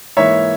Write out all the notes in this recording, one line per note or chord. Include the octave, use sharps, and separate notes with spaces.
G#2 E3 A#3 C#5 E5